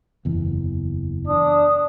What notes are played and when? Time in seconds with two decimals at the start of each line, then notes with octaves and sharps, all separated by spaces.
0.25 F#1 E2
1.28 D4 D#6